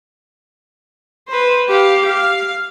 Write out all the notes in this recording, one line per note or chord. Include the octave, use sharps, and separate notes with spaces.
B4 C5
G4 F5
F5